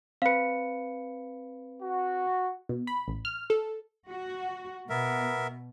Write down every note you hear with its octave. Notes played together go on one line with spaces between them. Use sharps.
C4 B4 F5 C#7
F#4
B2
B5
A1
F6
A4
F#4
B2 B3 A#4 E5